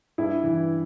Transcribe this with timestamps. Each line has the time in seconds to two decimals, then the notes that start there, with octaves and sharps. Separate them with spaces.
0.18 G2 E4
0.44 E3